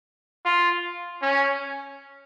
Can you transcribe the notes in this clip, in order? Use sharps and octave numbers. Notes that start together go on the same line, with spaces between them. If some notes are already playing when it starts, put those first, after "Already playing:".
F4
C#4